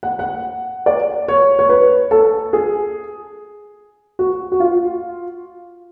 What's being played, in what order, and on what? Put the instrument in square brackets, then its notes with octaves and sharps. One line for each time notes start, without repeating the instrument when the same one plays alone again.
[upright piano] F#5
F#5
D5
C#5
C#5
B4
A4
G#4
F#4
F#4
F4